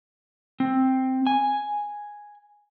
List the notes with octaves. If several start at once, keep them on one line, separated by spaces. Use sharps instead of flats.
C4
G#5